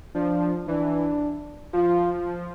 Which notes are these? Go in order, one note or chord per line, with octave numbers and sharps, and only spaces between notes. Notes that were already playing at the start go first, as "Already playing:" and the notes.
F3 D4
E3 D4
F3 F4